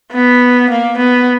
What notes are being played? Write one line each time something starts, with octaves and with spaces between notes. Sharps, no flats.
B3
A#3
B3